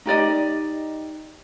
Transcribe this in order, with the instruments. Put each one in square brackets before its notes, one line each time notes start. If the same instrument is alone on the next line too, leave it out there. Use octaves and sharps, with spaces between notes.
[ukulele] D#4 G4 D5 D#5